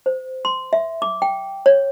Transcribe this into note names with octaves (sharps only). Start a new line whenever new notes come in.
C5
C6
E5
D6
G5
C#5